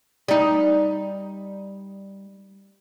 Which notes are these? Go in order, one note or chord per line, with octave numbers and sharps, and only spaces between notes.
G3 D#4